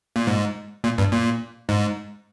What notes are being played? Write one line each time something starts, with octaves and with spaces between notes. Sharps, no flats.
A#2
G#2
A#2
G2
A#2
G#2